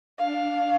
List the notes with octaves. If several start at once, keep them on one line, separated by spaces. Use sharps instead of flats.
D4 F5